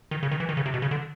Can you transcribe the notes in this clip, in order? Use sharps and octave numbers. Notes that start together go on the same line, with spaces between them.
D#3
C#3
D#3
E3
D#3
C#3
C3
B2
C#3
D3